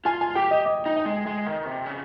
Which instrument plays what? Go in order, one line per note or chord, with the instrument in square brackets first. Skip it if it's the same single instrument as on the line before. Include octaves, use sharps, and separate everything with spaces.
[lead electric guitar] F4 [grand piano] G#5
[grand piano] G#5
[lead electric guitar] G4 [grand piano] G5
[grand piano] D#5
D#5
[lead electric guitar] D#4
[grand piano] D#5
[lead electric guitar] G#3
G#3
D#3
C3
C#3